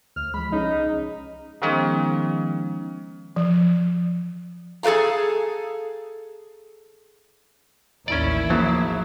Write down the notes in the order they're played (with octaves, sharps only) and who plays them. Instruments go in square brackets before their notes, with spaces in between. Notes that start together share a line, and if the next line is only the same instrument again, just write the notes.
[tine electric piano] D2 [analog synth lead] F6
[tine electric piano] F3 G#3 [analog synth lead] B5
[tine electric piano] C2 C#4 G#4 [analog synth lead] D#4
[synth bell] D#3 F3 G#3 B3 C#4 D#4
[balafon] F3
[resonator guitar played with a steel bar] G#4 A4 B4 F5 A#5
[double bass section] A1 D#2 [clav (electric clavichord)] C#4 D5 [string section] E4
[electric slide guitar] F3 A#3 G#4 [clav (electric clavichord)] F#3